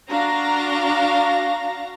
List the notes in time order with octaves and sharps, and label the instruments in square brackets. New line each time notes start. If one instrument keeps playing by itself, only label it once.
[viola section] D4 F#4 F5 A#5